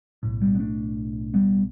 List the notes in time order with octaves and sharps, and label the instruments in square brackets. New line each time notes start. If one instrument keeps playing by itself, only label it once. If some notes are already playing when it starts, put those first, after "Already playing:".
[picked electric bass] B1 A2
G3 B3
B3
A3 D4
G3 B3